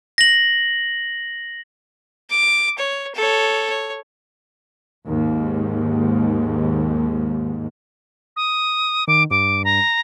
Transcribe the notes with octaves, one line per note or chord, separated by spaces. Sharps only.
A#6 F#7
D6
C#5
A4 C#5
C#5
D#2 G#2
D#6
D#3 D6
G2 D6
A#5